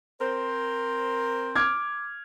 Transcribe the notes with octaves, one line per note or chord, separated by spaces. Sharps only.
C4 A#4 C5
D6 F6 G#6